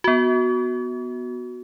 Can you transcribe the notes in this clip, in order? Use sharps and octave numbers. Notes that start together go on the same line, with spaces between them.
B3 F#4